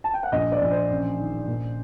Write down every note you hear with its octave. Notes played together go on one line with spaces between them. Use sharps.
A5
G5
F#5
A#1 D#5
D5
A#1
C5
A1
D#3
A#2